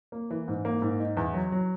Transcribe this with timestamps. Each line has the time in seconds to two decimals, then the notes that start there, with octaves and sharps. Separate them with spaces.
0.12 A#3
0.31 E3
0.48 G#2
0.65 A#3
0.82 G#2
1.00 D#4
1.17 E2
1.34 F#3
1.52 F#3